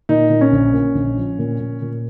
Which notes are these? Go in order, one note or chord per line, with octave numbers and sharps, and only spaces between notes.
A#2 D#4
A#2
C#4
A#1
A#2
A#1
F3
A#2
A#2
A#2